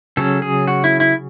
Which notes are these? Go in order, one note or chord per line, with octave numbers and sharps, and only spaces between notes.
C#3 F#3 C#4 A4
G#4
F#4
E4
E4